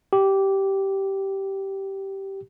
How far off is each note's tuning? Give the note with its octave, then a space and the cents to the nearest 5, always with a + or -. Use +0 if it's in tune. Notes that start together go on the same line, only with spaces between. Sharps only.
G4 -10